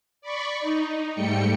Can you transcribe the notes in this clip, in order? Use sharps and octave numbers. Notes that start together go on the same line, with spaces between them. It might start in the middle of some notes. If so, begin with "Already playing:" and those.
D5 B5 C#6
D#4
G#2 G3 A3 G5 C#7